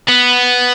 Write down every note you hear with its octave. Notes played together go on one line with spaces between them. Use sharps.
B3